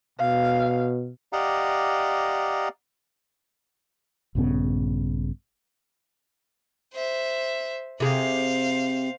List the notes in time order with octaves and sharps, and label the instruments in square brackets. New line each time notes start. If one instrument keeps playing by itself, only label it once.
[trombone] B2 [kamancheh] F5
[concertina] G4 D5 D#5 F5 F#5 A#5
[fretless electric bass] A#1 G2 C#3 B3
[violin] C5 E5
[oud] C3 G#4 [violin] C5 F5